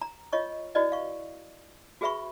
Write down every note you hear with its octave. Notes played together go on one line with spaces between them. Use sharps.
A#5
F4 C#5 D#5 C#6
E4 F#4 B4 D5 D#5
F5 C#6
F#4 G#4 B4 E5 B5 C#6